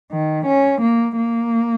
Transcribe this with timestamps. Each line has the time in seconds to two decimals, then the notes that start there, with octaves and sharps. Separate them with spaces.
0.12 D#3
0.46 C#4
0.81 A#3
1.17 A#3